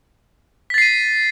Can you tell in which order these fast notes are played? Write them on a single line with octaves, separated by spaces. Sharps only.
B6 A6 C7 D#7